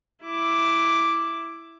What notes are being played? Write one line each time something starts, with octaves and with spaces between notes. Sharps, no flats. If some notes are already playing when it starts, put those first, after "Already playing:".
E4 D6